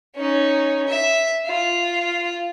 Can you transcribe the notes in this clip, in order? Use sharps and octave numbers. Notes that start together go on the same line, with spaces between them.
C#4 D#4
E5
F4